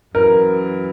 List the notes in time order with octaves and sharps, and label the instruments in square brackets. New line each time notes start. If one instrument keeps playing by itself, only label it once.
[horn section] F#2 E3 [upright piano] A#4